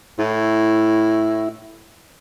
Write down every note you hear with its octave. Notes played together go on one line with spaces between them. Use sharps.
A2 E4